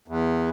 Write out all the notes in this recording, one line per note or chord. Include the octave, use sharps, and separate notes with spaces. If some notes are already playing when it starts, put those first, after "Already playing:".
E2